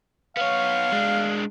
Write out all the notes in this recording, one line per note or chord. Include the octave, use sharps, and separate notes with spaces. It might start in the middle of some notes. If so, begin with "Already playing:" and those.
B3 C#5 F5
G#3 D4